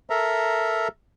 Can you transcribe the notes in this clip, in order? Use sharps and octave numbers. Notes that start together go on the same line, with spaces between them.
A4 A#4 E5 A#5